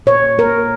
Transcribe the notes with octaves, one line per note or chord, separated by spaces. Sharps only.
A#2 C#5
A#3 A#4